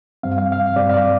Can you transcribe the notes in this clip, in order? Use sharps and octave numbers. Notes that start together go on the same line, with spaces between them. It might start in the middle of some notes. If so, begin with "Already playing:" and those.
G2 G3 C4 F5
F5
F5
F5
G2 G3 C4 D5
F5
D5